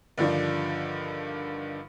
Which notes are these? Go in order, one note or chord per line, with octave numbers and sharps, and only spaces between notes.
G2 D3 D#3 F3 D4